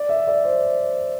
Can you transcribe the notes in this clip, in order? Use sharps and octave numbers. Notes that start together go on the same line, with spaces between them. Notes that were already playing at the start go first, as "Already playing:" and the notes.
Already playing: D5
E5
D5
C5